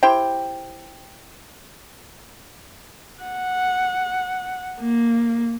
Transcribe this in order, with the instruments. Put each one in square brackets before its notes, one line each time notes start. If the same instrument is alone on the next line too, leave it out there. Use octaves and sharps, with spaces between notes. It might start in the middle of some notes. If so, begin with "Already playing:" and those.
[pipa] E4 G4 C5 G5
[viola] F#5
A#3